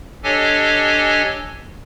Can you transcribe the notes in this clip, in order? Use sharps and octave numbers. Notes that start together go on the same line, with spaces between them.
D4 G4 A4 C#5 D#5 G#5